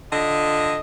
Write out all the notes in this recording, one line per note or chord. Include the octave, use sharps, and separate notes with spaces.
D3 F4 D#5